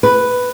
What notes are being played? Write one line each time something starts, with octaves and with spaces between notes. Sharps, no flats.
B4